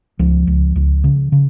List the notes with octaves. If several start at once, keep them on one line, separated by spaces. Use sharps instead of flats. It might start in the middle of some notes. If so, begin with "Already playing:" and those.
C#2 F3
C#2
C#2
C#3
C#3